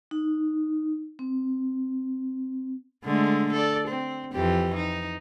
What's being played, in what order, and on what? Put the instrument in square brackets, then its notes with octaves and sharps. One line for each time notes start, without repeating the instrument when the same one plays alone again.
[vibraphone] D#4
C4
[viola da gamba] D3 G#3 A3
A4 D5
C4
F2 E3 G4
D#4